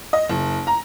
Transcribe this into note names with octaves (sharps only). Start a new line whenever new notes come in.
D#5
F#1
A#5